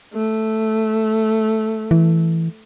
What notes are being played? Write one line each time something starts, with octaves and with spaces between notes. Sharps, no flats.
A3
E3